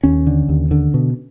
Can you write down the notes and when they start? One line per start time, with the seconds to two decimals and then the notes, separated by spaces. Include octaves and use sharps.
0.03 D#2 C#4
0.27 D3
0.49 D#2
0.71 D3
0.94 B2